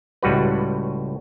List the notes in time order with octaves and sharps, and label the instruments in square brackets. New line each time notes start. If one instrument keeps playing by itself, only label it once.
[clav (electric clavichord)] C#2 A2 G3 F#4 B4